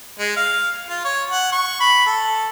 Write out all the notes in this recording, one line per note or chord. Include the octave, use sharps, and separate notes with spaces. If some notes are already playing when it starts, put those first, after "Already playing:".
G#3
F5
F4
C#5
F#5
C#6
B5
A4